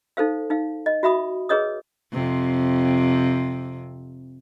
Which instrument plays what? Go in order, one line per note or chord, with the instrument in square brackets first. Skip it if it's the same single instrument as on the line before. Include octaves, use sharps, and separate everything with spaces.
[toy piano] D#4 A4 C5 F5
D#4 F5
D#5
F#4 E5 B5 D#6
G#4 B4 C#5 D#5 D#6
[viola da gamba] F2 C3